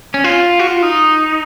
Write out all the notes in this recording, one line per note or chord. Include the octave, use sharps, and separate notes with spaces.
C#4
F4
F#4
F4
D#4